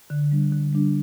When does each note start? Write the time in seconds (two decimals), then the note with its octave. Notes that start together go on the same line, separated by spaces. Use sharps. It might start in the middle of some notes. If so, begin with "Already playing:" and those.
0.10 D3
0.31 G3 D4
0.52 D3
0.73 G3 D4